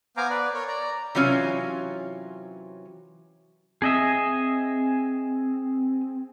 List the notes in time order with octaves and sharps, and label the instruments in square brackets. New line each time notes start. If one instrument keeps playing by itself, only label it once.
[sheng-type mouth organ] B3 C5 F5 G#5 A#5 D6
B4 D5
A#4 C#5
D5 A#5
[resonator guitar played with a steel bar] C3 E3 F#3 C#4 F4
[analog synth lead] C4 [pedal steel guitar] G#4 D#5 E5